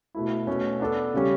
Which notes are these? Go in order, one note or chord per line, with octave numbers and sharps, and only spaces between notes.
B2 A3 E4
B2 A3 C#4
B3 D4 A4
C#3 G3 C#4